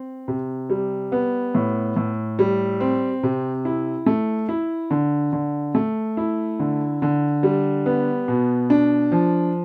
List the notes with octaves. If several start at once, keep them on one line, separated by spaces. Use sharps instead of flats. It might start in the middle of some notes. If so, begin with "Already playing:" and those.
Already playing: C4
C3
G3
B3
A2
A2
G3
C4
C3
E4
A3
E4
D3
D3
A3
E4
D3
D3
G3
B3
B2
D4
F3